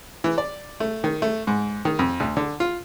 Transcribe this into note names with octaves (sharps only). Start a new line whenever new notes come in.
E3
D5
A3
D#3
A3
G#2
D#3
F2
D2
D3
F4